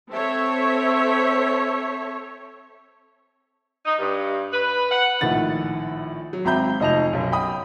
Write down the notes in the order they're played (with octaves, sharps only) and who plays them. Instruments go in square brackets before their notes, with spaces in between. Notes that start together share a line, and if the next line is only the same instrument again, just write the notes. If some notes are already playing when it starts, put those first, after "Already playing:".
[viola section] C4 A4 C#5 E5
[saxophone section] D#4
G2
B4
F#5
[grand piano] A#1 A2 D#3 F#5 A6
F#3
G#1 C4 E5 A#5 B5 G6
F1 D#4 D#5 A5 F7
B1 F#2
G5 B5 D#6